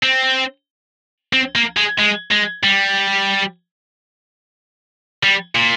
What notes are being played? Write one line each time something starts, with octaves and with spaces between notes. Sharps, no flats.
C4
C4
A#3
G#3
G#3
G#3
G3
G3
A#2